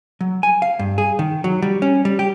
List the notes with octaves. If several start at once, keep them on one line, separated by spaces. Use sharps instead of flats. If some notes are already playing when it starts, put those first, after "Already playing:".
F#3
G#5
F5
G2
G#4
D#3
F#3
G3
C#4
G3
G4